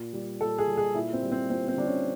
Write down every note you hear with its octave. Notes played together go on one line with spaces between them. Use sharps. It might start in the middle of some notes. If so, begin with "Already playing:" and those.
Already playing: A#2
G3
A#2 A4
G#4
G3
G#4
A#2 E4
C4
G3
C4
A#2 C4
C4
G3 D4
C#4